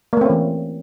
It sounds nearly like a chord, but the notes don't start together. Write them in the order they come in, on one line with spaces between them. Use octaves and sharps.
A#3 A3 C4 C#4 E3